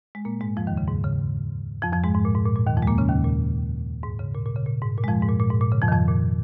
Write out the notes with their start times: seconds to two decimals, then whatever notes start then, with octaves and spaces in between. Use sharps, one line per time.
0.15 G#3
0.25 A#2 A#3
0.41 G#2 G#3
0.57 F2 F3
0.67 D#2 D#3
0.77 C#3
0.88 G#2
1.04 C#3
1.82 F2 F3
1.93 F2 F3
2.04 G#2 G#3
2.14 G#2
2.25 A#2
2.35 G#2
2.46 A#2
2.56 A#2
2.67 D#2 D#3
2.77 F2 F3
2.83 G#3
2.87 A#2 A#3
2.98 C#3 C#4
3.09 D#2 D#3
3.24 A#2
4.03 G#2
4.19 C#3
4.35 A#2
4.46 A#2
4.56 C#3
4.66 A#2
4.82 G#2
4.97 A#2
5.04 G#3
5.08 F2 F3
5.22 G#2
5.29 A#2
5.40 A#2
5.50 G#2
5.61 A#2
5.71 C#3
5.82 F2 F3
5.88 D#3
5.92 F2 F3
6.08 A#2